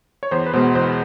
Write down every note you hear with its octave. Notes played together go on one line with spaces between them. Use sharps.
C#5
E2 C5
B4
B2 G#3 B3 C5
E2 C5